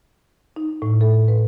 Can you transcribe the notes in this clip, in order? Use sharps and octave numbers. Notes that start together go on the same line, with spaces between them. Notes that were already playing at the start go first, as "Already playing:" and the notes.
D#4
A2
A4
B4